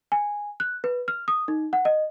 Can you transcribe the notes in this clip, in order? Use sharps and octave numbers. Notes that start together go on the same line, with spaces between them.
G#5
F#6
B4
F6
D#6
D#4
F#5
D#5